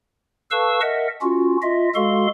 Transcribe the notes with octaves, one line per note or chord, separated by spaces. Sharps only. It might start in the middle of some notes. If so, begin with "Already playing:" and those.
A4 B4 F5 A5 C#6 E6
A#4 D#5 E5 F#5
C#4 F4 F#4
F4 D#5 E5
G#3 F#4 A4 F5 C6